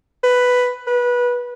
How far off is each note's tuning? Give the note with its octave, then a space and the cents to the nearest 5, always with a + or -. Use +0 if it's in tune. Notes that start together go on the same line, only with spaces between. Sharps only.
B4 +5
B4 -20